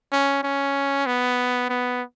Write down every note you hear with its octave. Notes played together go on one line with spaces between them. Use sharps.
C#4
C#4
B3
B3